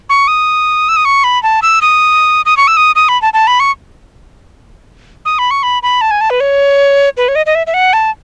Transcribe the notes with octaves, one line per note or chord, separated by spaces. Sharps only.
C#6
D#6
E6
D#6
C#6
B5
A5
E6
D#6
D#6
C#6
E6
D#6
D#6
B5
A5
A5
B5
C#6
D#6
B5
C#6
B5
B5
A5
G#5
A5
B4
C#5
B4
C#5
D#5
D#5
E5
E5
F#5
A5